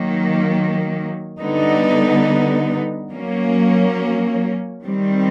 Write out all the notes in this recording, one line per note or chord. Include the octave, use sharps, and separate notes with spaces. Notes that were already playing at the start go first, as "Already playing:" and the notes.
Already playing: D#3 F#3 A#3
D3 G3 B3 D#4
F#3 A#3 C#4
D#3 G3 C4